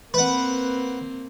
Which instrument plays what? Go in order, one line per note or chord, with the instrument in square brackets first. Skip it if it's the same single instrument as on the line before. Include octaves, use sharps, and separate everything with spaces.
[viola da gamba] A#3 C4 [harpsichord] B4 F#5